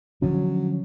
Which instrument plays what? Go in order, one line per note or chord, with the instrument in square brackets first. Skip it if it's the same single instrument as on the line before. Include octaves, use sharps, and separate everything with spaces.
[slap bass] D3 F3 C#4 [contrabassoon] F#3